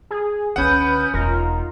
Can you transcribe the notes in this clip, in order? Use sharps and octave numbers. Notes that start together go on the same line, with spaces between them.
G#4
C#2 D3 C#4 B4 F#5 B5 D#6 G6
E1 D#4 F4 A#4